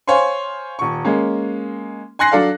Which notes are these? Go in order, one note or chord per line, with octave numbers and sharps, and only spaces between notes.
C5 C#5 F5 G#5 C6
D#1 C#6
G#3 A#3 C#4
G#5 C6 F#6 A#6 C7
F#3 D4 A4 D5 F5